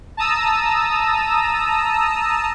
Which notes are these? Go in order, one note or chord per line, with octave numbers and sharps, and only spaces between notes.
A5 A#5 D#6 E6